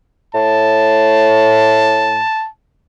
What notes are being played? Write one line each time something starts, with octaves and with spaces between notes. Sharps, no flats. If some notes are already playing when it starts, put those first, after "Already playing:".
A2 A5